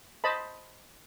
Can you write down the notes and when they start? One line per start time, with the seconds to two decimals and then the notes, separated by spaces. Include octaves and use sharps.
0.24 C5 D#5 A5 B5